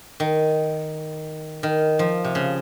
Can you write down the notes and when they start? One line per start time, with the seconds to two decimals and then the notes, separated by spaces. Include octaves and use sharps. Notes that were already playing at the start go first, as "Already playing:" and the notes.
0.20 D#3
1.63 D#3
1.99 F3
2.24 C3
2.35 C#3